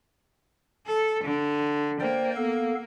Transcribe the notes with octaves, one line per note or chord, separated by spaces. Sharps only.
A4
D3
A#3 C5 D5 G5
B3 A4 F5